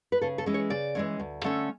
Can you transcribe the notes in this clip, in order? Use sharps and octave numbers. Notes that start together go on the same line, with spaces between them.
B4
C#3 A4
A4
E3 G#3 C#4
C#5
C#3 D5
E3 G#3 C#4
D2
D3 A3 C#4